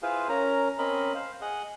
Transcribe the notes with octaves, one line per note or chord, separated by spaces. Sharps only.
E4 F4 G#4 B4 C5 F5
C#4 A#4 A#5
C4 C#4 A#4 D#5 B5
C5 F5
G#4 D#5 F#5